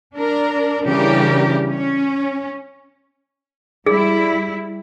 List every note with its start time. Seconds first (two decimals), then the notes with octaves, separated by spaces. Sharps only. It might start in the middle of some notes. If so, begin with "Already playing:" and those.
0.14 D4 A#4
0.83 C#3 E3 G3 D4 G4 A#4
1.68 C#4
3.86 G3 E4 G#4